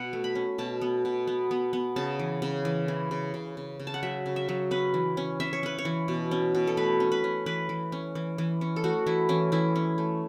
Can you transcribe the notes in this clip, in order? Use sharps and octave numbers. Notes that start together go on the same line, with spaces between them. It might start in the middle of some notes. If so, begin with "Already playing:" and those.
Already playing: B2 F#5
A3
B5
C#4
B2 A5
B3
B2
B3
B3
B3
C#3 A5
E3
C#3
E3
E3
C#3
C#3
C#3
C#3
A5
F#5
F#3 E5
C#3
E5
F#3
C#4 B4
E3
C#4
C#4 E5
C#5
C#4 B4
C#5
E3
B2
C#4
B2
A4
A3 B4
C#4
B4
C#4
E3 B4
E3
C#4
E3
E3
C#4
A4
A3 F#4
E3 E4
E3 C#4
E3 E4
C#4
A3